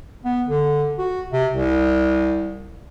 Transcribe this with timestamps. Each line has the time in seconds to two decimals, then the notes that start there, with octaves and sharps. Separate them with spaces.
0.25 B3
0.48 D3
0.98 F#4
1.32 C3
1.54 C2